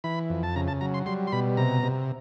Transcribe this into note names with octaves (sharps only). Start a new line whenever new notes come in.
E3 B5
F2
A5
C#3 A#5
A5
F#3 A#5
C6
G3 C6
C6
B2 B5
C3 A#5
C3